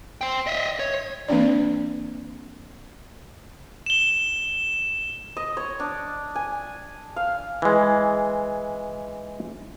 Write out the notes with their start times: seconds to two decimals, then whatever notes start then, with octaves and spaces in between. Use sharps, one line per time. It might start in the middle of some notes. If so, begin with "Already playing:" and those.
0.21 C5 G5
0.47 D#5 E5
0.79 C#5
1.28 E3 A#3 C4 D4 D5
3.86 E7 G7
5.37 D#5
5.57 C#5
5.80 D4
6.35 G#5
7.16 F5
7.62 E3 G#3